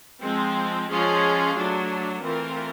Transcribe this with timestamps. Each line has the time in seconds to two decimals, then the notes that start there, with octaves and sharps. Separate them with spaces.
0.22 F3 G#3 C4
0.89 F3 G#3 C#4 F4 G#4
1.56 F#3 A3 D4
2.22 E3 A3 C4 F4 A#4